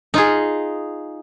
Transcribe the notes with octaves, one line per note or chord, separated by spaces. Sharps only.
D#4 F4 G#4